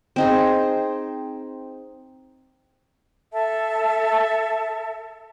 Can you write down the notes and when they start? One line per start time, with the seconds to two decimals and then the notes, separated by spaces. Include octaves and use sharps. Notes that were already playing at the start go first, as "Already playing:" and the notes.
0.16 C4 D#4 G#4
3.32 A4 E5 A5